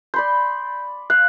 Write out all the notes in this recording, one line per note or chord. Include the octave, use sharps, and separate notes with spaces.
D5 B5 C6 G6
F5 F#6